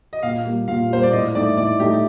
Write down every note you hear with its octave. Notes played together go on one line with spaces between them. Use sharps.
D#5
A#2 F5
G3 A#3
A#2 F5
G3 A#3 C5
D5
A2 D#5
A3 D#4 D5
A2 D5
A3 D#4 G4